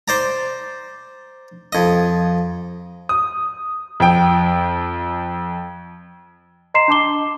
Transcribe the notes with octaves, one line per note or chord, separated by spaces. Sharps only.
C5 D5 A#5
F2 D#5
D#6
F2 G5
D#5 A#5 C6 C7 E7
D4 A5 D6 G7